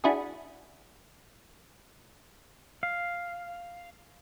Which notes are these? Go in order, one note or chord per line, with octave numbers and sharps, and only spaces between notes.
D4 E4 F#4 G#4
F5